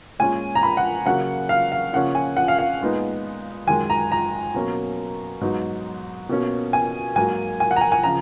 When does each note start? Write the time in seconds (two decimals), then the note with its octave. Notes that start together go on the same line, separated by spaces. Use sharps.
0.19 A#2 G#3 C#4 G#5
0.55 A#5
0.63 B5
0.77 F#5
1.06 C#3 F#3 A#3 C#4 F#5
1.49 F5
1.72 F5
1.93 C#3 F3 A#3 C#4 F#5
2.15 G#5
2.37 F#5
2.48 F5
2.59 F5
2.81 A#2 G#3 B3 D#4
3.67 F#2 D#3 G#3 G#5
3.90 A#5
4.12 A#5
4.54 B2 F#3 A#3 C#4
5.41 G#2 F#3 B3 D#4
6.29 B2 A#3 C#4
6.73 G#5
7.16 G#2 F#3 A#3 G#5
7.60 G#5
7.71 F#5
7.76 A#5
7.81 G#5
7.92 G#5
8.04 C#3 F3 A#5